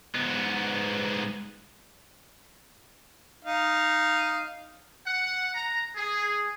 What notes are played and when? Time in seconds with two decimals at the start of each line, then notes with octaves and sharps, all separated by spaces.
0.15 G#2 B3
3.45 D#4 F5
5.06 F#5
5.54 A#5
5.95 G#4